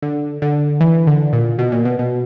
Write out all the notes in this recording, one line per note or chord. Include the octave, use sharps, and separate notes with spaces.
D3
D3
E3
D3
A#2
B2
A#2
B2
B2